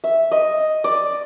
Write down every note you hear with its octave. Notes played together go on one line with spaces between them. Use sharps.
E5
D#5
D5